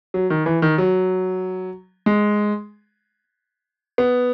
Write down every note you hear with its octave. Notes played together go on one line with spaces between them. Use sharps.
F#3
D#3
E3
D#3
F#3
G#3
B3